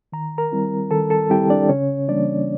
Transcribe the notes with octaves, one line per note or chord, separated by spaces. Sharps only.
D#3 A#5
A#4 A#5
G3 C4 E4
D#3 A4 A5
A4 A5
G3 C4 E4 G4 G5
D4 D5
C#3 C#4 C#5
E3 G3 A#3 D4 D5